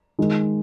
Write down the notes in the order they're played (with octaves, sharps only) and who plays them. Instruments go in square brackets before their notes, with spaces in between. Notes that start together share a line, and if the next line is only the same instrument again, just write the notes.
[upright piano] D#3 G#3 D#4